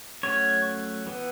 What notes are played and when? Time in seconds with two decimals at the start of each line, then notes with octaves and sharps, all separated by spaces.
0.23 F#3 A3 C#4 C#5
1.06 E3 B3